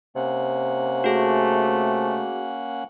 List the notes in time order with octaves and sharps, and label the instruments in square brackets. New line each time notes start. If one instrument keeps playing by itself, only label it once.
[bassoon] C3 [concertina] A#3 C#4 F#5
[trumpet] A3 [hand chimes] F#4 G#4